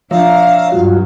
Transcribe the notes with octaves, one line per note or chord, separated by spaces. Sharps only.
F3 D4 C#5 E5 F5 A#5
G2 F#3 F4 F#4